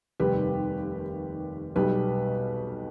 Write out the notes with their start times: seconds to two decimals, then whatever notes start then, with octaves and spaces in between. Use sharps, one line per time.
0.20 F1 D#2 D#3 G3 G4 B4
1.76 B1 B2 G3 G4 B4